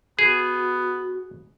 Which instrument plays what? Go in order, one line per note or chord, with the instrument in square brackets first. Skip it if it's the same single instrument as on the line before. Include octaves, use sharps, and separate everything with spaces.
[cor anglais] B3 [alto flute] F#4 [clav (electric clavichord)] G#4